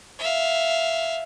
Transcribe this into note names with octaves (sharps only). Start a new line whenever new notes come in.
E5 F5